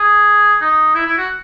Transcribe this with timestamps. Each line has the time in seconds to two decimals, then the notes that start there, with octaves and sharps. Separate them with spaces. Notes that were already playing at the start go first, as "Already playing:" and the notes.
Already playing: G#4
0.61 D#4
0.95 E4
1.06 E4
1.18 F#4